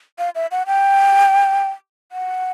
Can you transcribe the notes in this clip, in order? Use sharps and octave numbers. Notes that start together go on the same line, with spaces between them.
F5
E5
F#5
G5
F#5